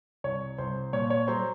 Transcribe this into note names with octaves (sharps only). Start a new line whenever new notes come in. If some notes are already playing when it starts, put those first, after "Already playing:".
C2 C#5
C2 C5
A#2 C#5
C#5
F#3 C5